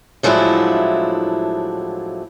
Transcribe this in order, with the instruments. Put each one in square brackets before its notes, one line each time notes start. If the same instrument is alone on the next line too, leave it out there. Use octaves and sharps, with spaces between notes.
[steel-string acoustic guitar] A2 F3 F#3 G#3 D4 E4